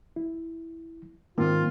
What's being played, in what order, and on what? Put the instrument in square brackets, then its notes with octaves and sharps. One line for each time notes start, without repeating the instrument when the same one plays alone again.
[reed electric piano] E4
[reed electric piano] G#2 A#3 [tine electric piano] D#3 C4 [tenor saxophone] F4